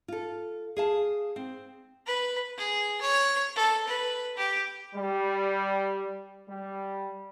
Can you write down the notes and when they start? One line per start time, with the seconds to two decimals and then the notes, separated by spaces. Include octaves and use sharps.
0.08 F4 A4
0.77 G#4 F5 A5
1.36 C4
2.07 B4
2.58 G#4
3.01 C#5
3.56 A4
3.87 B4
4.37 G4
4.95 G3
6.48 G3